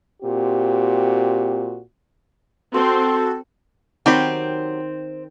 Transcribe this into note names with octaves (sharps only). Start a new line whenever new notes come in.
A#2 C4 F#4 G4
C4 F#4 A4 C6
D#3 F#3 C4 G4 B5